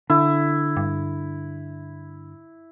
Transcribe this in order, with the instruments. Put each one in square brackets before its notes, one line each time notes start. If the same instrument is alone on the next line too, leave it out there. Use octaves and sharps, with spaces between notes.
[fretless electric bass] D3 [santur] E4
[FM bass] G2